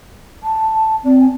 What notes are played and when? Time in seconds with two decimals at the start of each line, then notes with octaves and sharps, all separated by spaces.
0.43 A5
1.05 C4 D5
1.20 G#5